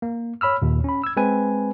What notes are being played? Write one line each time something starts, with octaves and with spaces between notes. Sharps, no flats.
A#3
C#5 B5 E6 F6
D#2 A#2
C#4 B5
E6 G#6
G#3 C4 B4 G#5